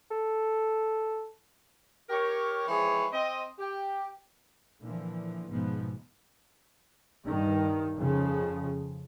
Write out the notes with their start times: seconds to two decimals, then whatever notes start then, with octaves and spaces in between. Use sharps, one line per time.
0.11 A4
2.10 G4 A#4 C#5
2.68 E3 F3 G#3 C4 G#4 C#5
3.12 C4 D#5
3.58 G4
4.81 A#2 D3 E3 F3
5.50 A#1 G#2 B2 F3 B3
7.26 G2 D#3
7.95 F2 C#3 F3